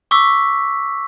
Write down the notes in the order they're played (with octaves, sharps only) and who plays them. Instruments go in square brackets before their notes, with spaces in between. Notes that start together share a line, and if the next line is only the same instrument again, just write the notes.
[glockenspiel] C#6 D6 E6 B6